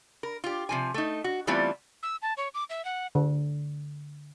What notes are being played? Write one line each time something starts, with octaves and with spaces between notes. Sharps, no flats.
A#4
F4 G4
C3 F3 G#5
A3 D#4
F#4
E3 G3 A3 B3 C4 F4
E6
A5
C#5
D6
E5
F#5
D3